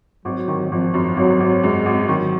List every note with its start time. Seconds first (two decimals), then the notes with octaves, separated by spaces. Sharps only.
0.25 G#1 F#3
0.48 D#3
0.71 G#1 F3
0.94 F#2
1.17 G#1 F#3
1.40 G#1
1.63 F#2 G#3
1.86 G#1
2.08 D#3 F#3